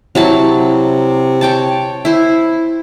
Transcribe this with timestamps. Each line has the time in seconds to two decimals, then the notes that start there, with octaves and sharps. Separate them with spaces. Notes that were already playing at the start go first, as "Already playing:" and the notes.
0.15 C3 F#3 E4 A5
1.41 C#5 G5 A5
2.05 E4 C5